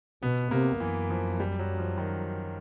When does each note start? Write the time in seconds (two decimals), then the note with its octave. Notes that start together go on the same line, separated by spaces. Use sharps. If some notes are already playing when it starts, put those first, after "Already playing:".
0.22 B2 B3
0.51 C3 A#3
0.80 F#2 E3
1.10 F3
1.40 G3
1.59 F#3
1.78 F3
1.98 D#3